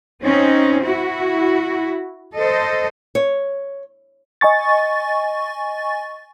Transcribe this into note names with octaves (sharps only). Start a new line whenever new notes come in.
C4 C#4 D#4
E4 F#4
A4 C5 D#5
C#5
D#5 G#5 C#6 A6